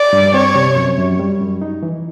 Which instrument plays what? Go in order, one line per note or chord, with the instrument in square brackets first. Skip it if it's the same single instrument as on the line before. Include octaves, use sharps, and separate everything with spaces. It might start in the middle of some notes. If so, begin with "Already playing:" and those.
Already playing: [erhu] D5
[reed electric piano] G2
[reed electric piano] C4 [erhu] C#5
[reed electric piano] C3
F#2
F#2
G3
F#2
D#4
E3